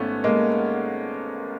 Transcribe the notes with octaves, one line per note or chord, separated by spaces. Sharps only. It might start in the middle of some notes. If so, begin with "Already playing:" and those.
Already playing: G#1 A3 B3 C#4
G#3 A#3